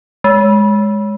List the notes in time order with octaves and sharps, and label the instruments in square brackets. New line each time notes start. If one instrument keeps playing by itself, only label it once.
[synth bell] G#3